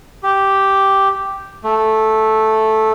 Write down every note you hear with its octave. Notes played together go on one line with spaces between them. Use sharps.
G4
A3